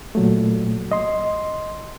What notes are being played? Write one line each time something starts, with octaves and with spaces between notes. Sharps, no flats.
A#2 F#3 A3
D#5 C6